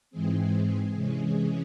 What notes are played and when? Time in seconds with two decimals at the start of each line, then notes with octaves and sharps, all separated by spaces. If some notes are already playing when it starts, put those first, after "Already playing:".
0.11 G#2 E3 G#3 C4 G#4
0.94 C3 E3 G#3 C#4